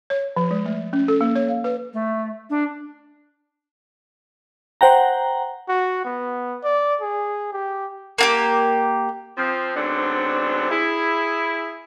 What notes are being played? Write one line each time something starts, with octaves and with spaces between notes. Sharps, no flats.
C#5
F3
G#3
A3
C#4
A4
A#3
C#5
F5
B4
A3
D4
C5 F#5 G5 A#5
F#4
B3
D5
G#4
G4
A#3 F4 G4
F3 C4
G#2 B2 D3 F#3 C4 D4
E4 G#4